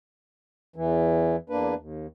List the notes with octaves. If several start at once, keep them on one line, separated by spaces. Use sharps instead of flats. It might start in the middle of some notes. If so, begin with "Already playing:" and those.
E2 E3
E2 A#3 D4 B4
D#2